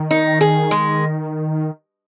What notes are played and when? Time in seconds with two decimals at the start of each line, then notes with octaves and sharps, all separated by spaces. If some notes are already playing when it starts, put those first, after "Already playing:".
Already playing: D#3
0.11 D#4
0.41 G#4
0.71 G#3